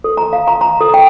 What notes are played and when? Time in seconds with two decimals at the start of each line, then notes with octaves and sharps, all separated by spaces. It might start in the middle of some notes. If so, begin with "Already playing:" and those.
0.04 A4
0.17 A#5
0.33 F5
0.48 A#5
0.61 A#5
0.81 A4
0.94 G5